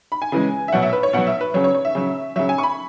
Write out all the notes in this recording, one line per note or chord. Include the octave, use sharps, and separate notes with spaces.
B5
G#5
C#3 E3 G#3
E5
B2 F#3 F#5
E5
B4
C#5
B2 F#3 F#5
E5
B4
C#3 F#3 C#5
C#5
C#5
E5
C#3 F#3
C#3 F#3 E5
G#5
C#6
B5